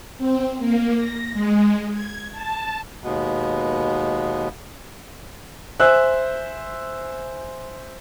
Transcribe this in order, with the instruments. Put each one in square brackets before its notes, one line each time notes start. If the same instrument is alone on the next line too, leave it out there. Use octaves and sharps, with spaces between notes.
[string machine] C4
A#3
A#6
G#3
G#6
A5
[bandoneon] D#2 B2 G#3 B3
[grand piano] C5 E5 G#5 E6 F#6